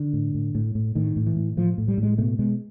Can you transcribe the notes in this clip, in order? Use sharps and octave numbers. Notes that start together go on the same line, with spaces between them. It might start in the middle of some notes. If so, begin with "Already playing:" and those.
Already playing: D3
A2
A2
A2
A2
A2 D#3
A2
E3
A2
A2 F3
A2
G3
A2
G#3
B2 A3
B2 G#3